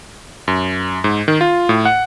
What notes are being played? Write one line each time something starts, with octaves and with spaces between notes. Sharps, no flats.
F#2
G#2
D#3
F4
A2
F#5